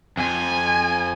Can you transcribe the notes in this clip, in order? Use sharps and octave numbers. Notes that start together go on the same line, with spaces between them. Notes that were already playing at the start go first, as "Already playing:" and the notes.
F2 G#5